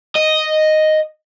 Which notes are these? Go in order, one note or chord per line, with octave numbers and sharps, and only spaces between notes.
D#5